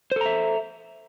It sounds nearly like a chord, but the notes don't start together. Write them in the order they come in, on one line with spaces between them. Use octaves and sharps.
C5 A4 A#5 E5